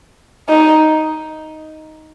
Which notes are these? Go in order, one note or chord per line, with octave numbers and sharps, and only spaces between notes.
D#4